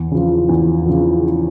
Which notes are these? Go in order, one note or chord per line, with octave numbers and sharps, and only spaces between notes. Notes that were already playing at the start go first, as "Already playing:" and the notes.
Already playing: E2
C#3 F3
E2
C#3 F3